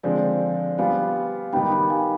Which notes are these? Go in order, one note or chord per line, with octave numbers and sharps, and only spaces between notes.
D3 F3 G#3 C4 D5 F5
G3 B3 F4 F5 G#5
D#3 G3 B3 D#4 G5 B5
G5 B5
F5 G#5